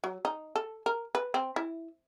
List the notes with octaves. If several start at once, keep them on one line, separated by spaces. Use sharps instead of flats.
F#3
D#4
A4
A#4
B4
C4
E4